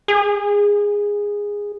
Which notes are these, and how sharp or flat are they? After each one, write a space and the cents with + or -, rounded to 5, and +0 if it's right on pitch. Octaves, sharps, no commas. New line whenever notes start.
G#4 -15